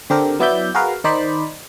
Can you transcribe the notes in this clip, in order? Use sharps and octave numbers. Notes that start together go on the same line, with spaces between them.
D3 C4 G4 A4 A#4
F#3 B3 E4 D5 E5 G6
F#4 G#4 A#4 B4 F5
D#3 D#4 C5 D5 B5